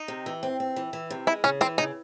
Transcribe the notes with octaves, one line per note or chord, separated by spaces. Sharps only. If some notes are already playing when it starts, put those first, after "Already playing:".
Already playing: D#4
C3
E3
C4
C4
E3
E3
C3
G#3 E4
C#3 C#4
E3 C4
C#3 D#4